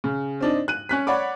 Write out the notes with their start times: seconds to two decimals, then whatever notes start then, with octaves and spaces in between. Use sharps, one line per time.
0.04 C#3
0.41 C4 D4 D#4
0.68 F#6 D#7
0.89 C#4 F#6 B6
1.07 C#5 D5 F#5 B5 D6